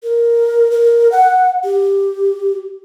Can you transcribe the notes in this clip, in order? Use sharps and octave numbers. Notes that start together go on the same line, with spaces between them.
A#4
A#4
F#5
G4